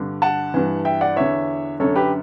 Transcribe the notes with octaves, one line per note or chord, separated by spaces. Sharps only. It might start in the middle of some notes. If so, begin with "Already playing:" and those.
Already playing: G2 D3
F#5 A5
G2 E3
E5 G5
D5 F#5
E2 D3 C#5 E5
F#2 D3 A4 C#5
G4 B4